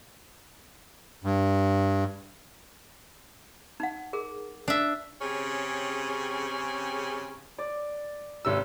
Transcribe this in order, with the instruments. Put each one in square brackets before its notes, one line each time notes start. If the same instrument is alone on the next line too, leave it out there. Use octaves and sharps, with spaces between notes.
[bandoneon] G2
[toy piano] D#4 F#5
G#4 A#4
[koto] D4 E5
[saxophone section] C#3 C4 C#4 G4 G#4
[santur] D5
[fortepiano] G#1 C3 E6